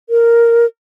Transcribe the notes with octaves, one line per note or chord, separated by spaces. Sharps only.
A#4